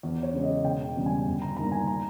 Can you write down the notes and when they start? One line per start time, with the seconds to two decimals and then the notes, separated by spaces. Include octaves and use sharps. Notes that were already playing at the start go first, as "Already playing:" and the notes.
0.03 E2
0.23 C#5
0.34 C#3 G#3
0.43 D#5
0.64 E1 G5
0.96 E2 C#3 G3
1.06 G#5
1.26 G1
1.42 A#5
1.57 G2 D#3 A#3 A#5
1.72 G#5
1.87 A#5